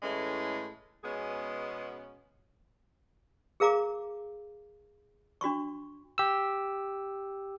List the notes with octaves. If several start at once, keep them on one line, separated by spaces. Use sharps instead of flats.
A2 E3 G#3 A3 C#4
B2 G#3 B3 C#4 G#4
G#4 A#4 F5 A#5 D6
D4 F#4 C6 C#6
G4 E6